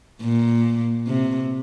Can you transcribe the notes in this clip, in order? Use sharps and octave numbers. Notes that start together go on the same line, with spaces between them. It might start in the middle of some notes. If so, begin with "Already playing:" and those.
A#2
C3